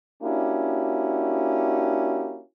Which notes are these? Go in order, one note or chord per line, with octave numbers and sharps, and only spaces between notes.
A#3 C#4 D4 E4 F#4 G4